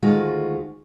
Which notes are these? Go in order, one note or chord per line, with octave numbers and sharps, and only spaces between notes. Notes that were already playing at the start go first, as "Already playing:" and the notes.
D2 D#3 G#3 A3 F4 F#4